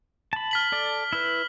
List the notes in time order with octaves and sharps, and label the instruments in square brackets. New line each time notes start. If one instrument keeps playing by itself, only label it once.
[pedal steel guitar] A5 B5
[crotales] F6 B6 F#7
[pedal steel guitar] A4 D5
E4 B4